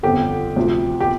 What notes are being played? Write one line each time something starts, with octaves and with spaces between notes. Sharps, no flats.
G1 F2 D3 G4
D2 C3 F3
G4